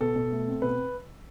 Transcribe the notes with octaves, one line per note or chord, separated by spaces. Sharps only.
B2 A4
B2
A3
C4
B2 B4